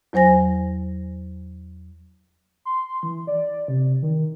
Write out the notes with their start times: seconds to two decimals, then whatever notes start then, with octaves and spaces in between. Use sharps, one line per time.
0.13 E2 F#3 C5 G#5 A#6
2.65 C6
3.03 E3
3.27 D5
3.68 C3
4.02 D#3